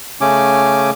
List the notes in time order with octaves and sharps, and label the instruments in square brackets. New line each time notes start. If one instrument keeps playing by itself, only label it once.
[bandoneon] C#3 A3 C#4 G#5 D6